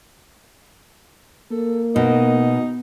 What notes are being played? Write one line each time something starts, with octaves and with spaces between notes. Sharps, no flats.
A#3 A4
B2 D#4